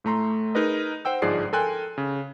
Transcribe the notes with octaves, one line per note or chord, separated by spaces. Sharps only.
A2 A3 A#5 C6
D#4 G#4 A#4 B4 D#5
C5 F#5 G5 E6
G1 G#2 F3 G#4 D5 C7
A4 A#4 G5 G#5 C6 F#6
C#3